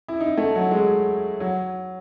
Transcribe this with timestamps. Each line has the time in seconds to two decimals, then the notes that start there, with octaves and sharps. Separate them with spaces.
0.08 E4
0.21 D#4
0.37 A3
0.55 F#3
0.71 G#3
1.40 F#3